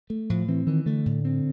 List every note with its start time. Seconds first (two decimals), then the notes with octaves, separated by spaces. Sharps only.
0.10 A3
0.30 A2 F3
0.48 E3 C4
0.67 D#3 E3
0.86 D3 A3
1.06 A2
1.25 C4